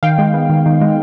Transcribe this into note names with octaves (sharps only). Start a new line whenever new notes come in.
D#3 F5 G5
G#3
B3
D#3
D#3
G#3